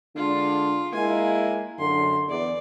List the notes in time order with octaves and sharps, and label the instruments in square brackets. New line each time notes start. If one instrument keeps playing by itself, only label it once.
[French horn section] D3 G#3 D4 [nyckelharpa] F4
[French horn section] G#3 A#3 E4 [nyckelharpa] G#5
[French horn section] F#2 D3 [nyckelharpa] C6
[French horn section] E2 [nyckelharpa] D5